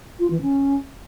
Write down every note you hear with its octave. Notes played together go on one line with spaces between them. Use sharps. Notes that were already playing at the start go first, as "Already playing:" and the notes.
F4
E3
C#4